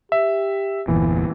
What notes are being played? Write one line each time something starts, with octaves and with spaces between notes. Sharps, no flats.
G4 E5
G1 E2 A#2 E3